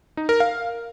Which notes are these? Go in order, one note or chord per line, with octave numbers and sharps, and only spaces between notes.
D#4
A#4
F5